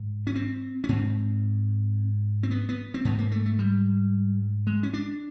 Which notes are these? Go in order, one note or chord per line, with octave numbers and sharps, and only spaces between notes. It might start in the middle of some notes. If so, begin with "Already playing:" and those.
Already playing: G#2
C#4
C4
C#4
G#2 C4
C4
B3
B3
C4
G#2 B3
A#3
A3
A3
G3
G#3
C#4
D4